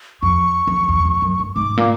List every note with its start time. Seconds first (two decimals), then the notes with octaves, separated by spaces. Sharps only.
0.22 F2 C#6
0.67 F2
0.88 E2
1.05 F2
1.22 F#2
1.39 G2
1.56 G#2 D6
1.77 A#2